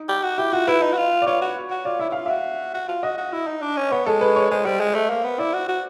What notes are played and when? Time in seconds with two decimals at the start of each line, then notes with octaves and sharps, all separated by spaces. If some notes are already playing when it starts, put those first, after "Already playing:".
Already playing: D#4
0.09 G4
0.23 F#4
0.38 E4 G4
0.53 F4 F#4
0.68 E4 B4
0.82 D#4
0.93 F#4
0.97 F4
1.22 D5
1.27 F4 C#5
1.41 F#4
1.71 F#4
1.85 F4 D5
1.99 E4 E5
2.10 E4
2.12 F4 F5
2.26 F#4 E5
2.74 F#4
2.89 F4
3.03 F#4 D#5
3.18 F#4
3.33 E4
3.47 D#4
3.62 D4
3.77 C#4
3.92 B3 C#5
4.06 G#3 A4
4.21 B4
4.36 C#5
4.51 G#3 C5
4.65 G3 C5
4.80 G#3
4.95 A3
5.09 A#3
5.24 B3
5.39 E4 D5
5.53 F#4
5.68 F#4